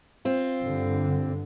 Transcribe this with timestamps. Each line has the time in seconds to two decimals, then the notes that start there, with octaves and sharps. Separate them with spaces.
0.25 C4 F4
0.61 G2 D3